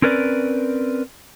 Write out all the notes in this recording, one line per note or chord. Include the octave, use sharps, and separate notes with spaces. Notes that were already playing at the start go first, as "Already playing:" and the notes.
C4 C#4 A#4 B4 D5